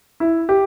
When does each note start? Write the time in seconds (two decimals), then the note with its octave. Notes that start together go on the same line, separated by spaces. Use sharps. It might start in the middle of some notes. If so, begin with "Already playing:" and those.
0.20 E4
0.49 G4